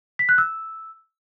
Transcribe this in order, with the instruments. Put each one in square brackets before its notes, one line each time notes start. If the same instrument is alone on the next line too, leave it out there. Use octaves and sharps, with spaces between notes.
[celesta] B6
F#6
E6